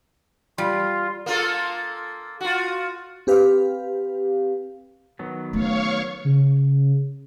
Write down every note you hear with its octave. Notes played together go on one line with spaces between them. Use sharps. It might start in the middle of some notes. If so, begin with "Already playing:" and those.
G3 F4
A#3 F4 A4
F4 F#4
C4 G4 B4 F5
D#3 F#3 B3
A3 C#4 C#5 F5 C#6
C#3